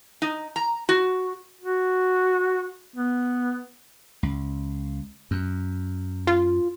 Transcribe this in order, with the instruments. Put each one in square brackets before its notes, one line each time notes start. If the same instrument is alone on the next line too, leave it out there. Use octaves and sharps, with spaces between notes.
[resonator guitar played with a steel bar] D#4
A#5
F#4
[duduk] F#4
B3
[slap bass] C#2
F#2
[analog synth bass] F4